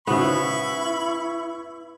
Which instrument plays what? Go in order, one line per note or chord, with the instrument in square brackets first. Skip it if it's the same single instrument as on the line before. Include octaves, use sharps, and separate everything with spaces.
[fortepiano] G#2 C#3 [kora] B3 [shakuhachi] E4 [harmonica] B5 C#6